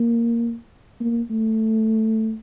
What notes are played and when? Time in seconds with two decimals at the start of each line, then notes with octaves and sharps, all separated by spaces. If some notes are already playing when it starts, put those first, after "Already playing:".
Already playing: A#3
1.00 A#3
1.30 A3